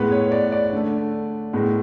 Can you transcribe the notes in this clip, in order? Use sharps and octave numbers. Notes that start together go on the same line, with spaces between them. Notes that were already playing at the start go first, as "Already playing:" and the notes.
Already playing: A2 G#3 B3 B4
C#5
D5
D5
D3 A3
A2 G#3 B3